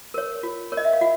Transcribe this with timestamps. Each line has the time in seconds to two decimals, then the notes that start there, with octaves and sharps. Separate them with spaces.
0.14 A#4 C#5
0.43 F4
0.72 A#4 C#5
0.77 D#5
0.85 E5
0.93 F5
1.01 F4 F#5